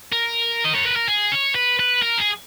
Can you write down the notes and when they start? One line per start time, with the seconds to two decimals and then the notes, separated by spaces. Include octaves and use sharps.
0.12 A#4
0.65 D#5
0.75 C#5
0.86 B4
0.96 A#4
1.08 G#4
1.32 C#5
1.55 B4
1.79 B4
2.03 A#4
2.18 G#4